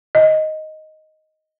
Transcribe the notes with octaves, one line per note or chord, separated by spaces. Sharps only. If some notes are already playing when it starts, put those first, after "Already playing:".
D#5